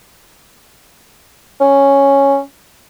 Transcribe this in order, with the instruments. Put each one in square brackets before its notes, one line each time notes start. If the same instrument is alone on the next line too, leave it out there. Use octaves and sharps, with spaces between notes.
[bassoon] C#4